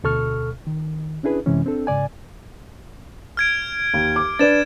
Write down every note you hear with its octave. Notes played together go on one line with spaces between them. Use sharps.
D2 B2 A4 C#6 F6
D#3
C#4 D4 E4 G#4 B4
F#2 C3 E3 G#3 C#4
C4 D4 A4
G#2 C#3 D5 G#5
F6 G#6 D7
D#2
D6
D4 B4 D5 A6 E7